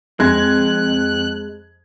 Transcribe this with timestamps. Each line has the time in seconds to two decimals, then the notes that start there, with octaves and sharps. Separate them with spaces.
0.20 F2 G#3 F#6 G#6